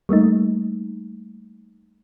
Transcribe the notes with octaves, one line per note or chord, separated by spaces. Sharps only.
G3 A3 A#3 D#4